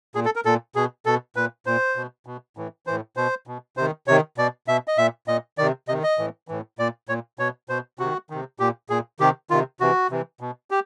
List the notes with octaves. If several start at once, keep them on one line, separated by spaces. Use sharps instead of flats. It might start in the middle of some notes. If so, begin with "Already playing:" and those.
A#2 G#4
A4
A#4
A#2 A4
B2 G#4
B2 A4
A#2 B4
A#2 C5
B2
B2
A2 E3
A2 E3 C5
B2 C5
B2
C3 D#3 C5
C3 D#3 C#5
B2 D5
B2 E5
D#5
A#2 E5
A#2 D#5
C3 D#3 D5
C3 D#3 D#5
D#5
A2 E3
A2 E3
A#2 D5
A#2 C#5
B2 C#5
B2 C5
C3 D#3 F#4
C3 D#3
A#2 G4
A#2 G#4
C3 D#3 G4
C3 D#3 F4
C3 E3 F#4
C3 E3
B2
G4